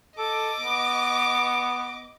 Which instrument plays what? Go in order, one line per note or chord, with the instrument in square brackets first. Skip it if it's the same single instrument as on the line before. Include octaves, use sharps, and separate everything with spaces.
[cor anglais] A4 [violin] D#5 D6
[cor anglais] B3